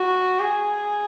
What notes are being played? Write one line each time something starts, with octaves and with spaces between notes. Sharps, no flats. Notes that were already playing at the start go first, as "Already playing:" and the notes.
Already playing: F#4
G#4